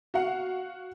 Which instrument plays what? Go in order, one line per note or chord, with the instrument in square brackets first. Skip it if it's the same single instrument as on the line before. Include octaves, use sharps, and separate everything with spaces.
[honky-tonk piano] F#4 F5 F#5